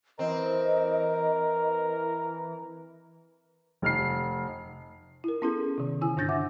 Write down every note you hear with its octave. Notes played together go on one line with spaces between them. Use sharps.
E3 C4 A#4 D#5
F1 F6 C7
E4 A#4
B3 C#4 E4 G#4 A4
C3 D#3
D3 E4 G#5 E6
G2 D3 D4 G6 A6 A#6
E5 F#5 D6